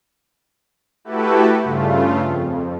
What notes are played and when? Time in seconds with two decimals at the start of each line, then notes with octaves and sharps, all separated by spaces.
1.05 A3 E4 F#4 G4 A4 B4
1.63 G2 C#3 A3 F4
2.24 F2